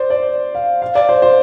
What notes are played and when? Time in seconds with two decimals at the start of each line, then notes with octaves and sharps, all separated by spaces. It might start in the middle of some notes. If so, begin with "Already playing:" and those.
Already playing: C5 D5
0.10 D5
0.55 F5
0.82 F5
0.95 D5
1.09 C5
1.22 C5